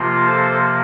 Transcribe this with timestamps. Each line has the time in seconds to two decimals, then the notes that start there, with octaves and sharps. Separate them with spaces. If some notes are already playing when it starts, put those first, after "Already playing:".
Already playing: C3 F3 A#3 F4
0.26 A4 C5